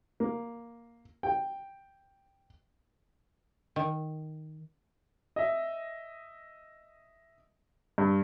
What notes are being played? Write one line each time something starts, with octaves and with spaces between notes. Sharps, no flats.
A#3
G5
D#3
D#5 E5
G2